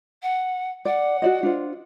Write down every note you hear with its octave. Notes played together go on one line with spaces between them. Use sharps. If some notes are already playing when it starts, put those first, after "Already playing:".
F#5
D5 F#5
F#4 D5 D#5
D4 F4 C5